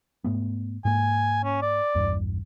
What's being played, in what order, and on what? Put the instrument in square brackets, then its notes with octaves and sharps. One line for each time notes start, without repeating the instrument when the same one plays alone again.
[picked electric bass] G#2 A3 B3
[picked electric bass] G#2 A#3 [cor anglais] G#5
[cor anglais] C#4
D5
[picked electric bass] A#1 E2 G2